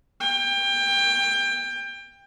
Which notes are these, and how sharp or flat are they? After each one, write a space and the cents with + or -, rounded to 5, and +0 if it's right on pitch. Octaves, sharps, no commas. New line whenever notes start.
G5 +25